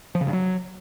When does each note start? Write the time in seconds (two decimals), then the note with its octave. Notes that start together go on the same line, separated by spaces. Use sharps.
0.15 F3
0.21 C#3
0.27 G2
0.33 F#3